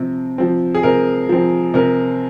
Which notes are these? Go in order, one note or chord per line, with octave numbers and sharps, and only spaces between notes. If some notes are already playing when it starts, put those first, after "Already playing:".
Already playing: C3 F3 C4
F3 C4
G#4
C3 A#4
F3 C4
C3 A#4